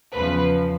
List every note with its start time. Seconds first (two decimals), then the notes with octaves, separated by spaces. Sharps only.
0.13 E2 C#3 F3 B4